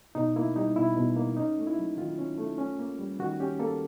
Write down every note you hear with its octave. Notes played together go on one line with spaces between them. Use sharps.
B2 D#4
A#3 E4
G3 D#4
B2 E4
B2
A#3
C#4 D#4
A3
E4
F#3
D#3 F4
C#4
A3
C#4
A#3
G3
D#3 F#4
C#4 G4
A#3 A4